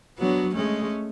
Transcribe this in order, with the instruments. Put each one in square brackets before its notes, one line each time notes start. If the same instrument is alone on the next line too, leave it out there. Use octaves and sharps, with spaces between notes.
[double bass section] F#3 [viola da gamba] B3 D4
[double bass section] G#3 [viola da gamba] A3 C#4